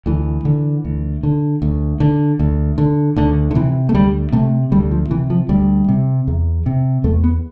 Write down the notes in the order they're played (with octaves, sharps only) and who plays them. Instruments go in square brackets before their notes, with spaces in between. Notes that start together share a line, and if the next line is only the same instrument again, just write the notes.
[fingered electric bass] D2 E3
D3
D2
D3
D2
D3
D2
D3
D2 D3
D3
C3 E3
A3
D2 G3
C3 A3
D2 G3
F3
C3 E3
F3
D2 G3
C3
E2
C3
E2 A3
B3